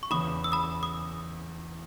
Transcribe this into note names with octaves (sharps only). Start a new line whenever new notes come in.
C#6
E2 C#3 E3 B5 D#6
E6
B5 D#6
D#6